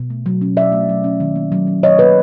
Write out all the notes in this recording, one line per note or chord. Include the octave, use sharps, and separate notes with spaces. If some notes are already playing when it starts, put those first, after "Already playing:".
Already playing: B2
A3
F#3
C#4
B2 D5 E5
A3
F#3
C#4
D#3
A#3
F#3
C#4
D#3 C#5 D#5
A#3 B4 C#5